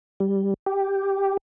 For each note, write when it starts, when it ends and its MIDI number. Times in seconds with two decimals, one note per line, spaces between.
0.20 0.54 55
0.66 1.37 67